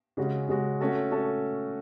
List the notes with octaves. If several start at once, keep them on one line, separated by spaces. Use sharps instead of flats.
C#3 G#3 C#4 F#4
C#3 G#3 C#4 F#4
A3 C#4 F#4 A4
A3 C#4 F#4 A4